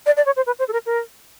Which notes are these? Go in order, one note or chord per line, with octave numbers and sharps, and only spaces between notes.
D5
D5
C#5
C5
B4
C5
A4
A#4
A#4